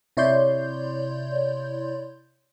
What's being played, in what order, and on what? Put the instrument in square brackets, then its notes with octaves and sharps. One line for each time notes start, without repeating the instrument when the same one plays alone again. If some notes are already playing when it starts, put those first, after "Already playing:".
[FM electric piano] C3 E4 C#5 D5 C6 G6